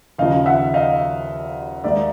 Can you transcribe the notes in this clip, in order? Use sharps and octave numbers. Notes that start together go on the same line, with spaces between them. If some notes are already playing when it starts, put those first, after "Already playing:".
D#2 C#3 F3 D#5 F5
E5 F#5
D#5 F5
D#2 D#3 G#3 D5 E5